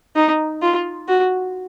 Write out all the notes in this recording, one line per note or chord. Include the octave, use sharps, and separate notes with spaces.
D#4
F4
F#4